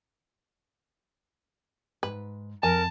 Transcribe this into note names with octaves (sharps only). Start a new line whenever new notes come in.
G#2 B4
F2 A#4 G#5 A5